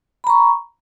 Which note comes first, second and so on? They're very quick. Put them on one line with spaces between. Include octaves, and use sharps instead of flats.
B5 A#5 C#6